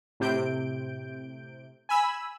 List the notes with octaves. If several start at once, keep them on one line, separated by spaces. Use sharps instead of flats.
A2 C3 G6 D7
G#5 B5 E6